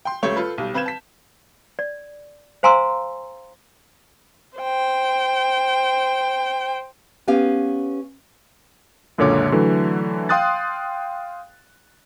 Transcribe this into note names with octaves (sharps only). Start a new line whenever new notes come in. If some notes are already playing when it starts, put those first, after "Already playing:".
G5 C6
C#2 C#3 G3 A3 C#5 G6
F4 A4 B4
B1 G3
C4 B4 F5 G6 G#6 E7
A5 B6
D5
C5 F5 G#5 A#5 C6 E6
C5 G5
B3 C#4 G4 F5
C#2 F#2 A#2 D3 C#5 D6
D3 E3 F#3 A3
F5 G5 C6 D#6 F#6 A6